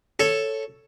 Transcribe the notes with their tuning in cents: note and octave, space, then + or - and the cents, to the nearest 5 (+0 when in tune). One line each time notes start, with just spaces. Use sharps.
A4 +0 C#5 +0